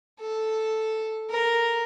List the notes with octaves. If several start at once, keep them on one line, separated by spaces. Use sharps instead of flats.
A4
A#4